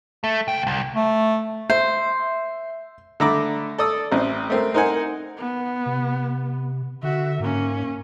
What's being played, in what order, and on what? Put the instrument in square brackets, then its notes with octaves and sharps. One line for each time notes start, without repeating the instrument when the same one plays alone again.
[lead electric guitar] A3
C#2 G5
C2
[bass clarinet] A3
[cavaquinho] C5 [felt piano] E5
[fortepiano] D3 A3 A#5 B5 D6
A4 D5 D#6 E6
A1 C4
A3 C4 A#4
D#4 A#4 C5 F#5 G#5
[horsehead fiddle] B3
[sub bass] C3
[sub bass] D3 [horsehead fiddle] F#4 E5
[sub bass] G#2 [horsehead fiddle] A#3 C#4